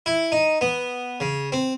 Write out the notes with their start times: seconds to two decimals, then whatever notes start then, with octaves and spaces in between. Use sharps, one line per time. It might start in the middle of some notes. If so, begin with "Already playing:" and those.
0.06 E4
0.32 D#4
0.61 B3
1.20 C#3
1.52 C4